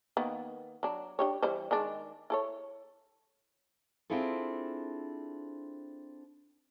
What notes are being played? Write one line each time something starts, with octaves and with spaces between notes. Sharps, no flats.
D#3 A#3 B3
F#3 D4
D4 G4 C#5
E3 G3 C5
D#3 G#3 D4
E4 A4 C#5
C4 D4 E4 F4 G#4 A4